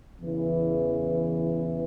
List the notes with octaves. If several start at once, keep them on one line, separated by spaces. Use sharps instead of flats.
E2 C#3 E3